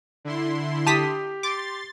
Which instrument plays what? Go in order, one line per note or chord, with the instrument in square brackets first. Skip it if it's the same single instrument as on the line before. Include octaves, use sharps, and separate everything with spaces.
[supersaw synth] D3 E4 C6
[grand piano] G4 [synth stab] A5 D#6 B6
[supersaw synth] C6 A6 [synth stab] D6